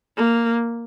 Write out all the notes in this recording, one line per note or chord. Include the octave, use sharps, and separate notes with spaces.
A#3